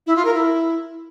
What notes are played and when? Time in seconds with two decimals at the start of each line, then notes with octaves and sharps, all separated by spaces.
0.07 E4
0.16 F4
0.25 A#4
0.34 E4